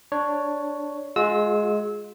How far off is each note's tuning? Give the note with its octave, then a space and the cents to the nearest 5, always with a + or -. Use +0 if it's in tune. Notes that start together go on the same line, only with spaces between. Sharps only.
D4 +0 C#5 +5
G#3 +15 F4 +40 E6 -25